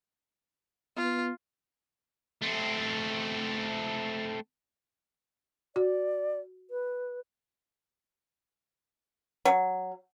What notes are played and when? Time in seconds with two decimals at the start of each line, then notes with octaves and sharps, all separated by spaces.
0.97 B3 F4
2.42 A3 C4
5.76 F#4 D5
6.70 B4
9.45 F#3